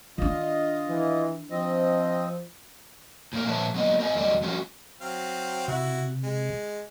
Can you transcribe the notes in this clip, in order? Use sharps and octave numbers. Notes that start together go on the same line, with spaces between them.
D#3 D4 F4 D#5
E3
F3 C4 D#5
A2 A#3 A#4
A#2 F3 B4 C#5 E5 A5
F#3 A#3 B3 D#5
A#4 D#5 G5 G#5
E2 F#3 G3 D5 D#5
F3 G3 C#4 F4 F#4
F#3 C4 F5
C3 E4 F#4
G#3